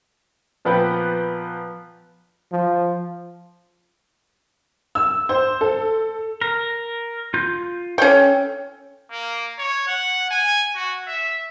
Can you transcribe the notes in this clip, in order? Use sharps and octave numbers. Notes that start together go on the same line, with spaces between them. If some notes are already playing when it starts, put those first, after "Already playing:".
A#2 F3 B3 B4 G5
F3
E6
C5
A4
A#4
F4 G6
C#4 A4 G5
A#3
C#5
F#5
G#5
F#4
E5